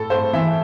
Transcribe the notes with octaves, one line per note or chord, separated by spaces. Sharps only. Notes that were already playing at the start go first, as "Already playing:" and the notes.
Already playing: A2 A4
A2 C5
E3 E5